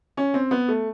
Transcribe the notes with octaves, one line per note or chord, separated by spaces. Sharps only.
C#4
C4
B3
A3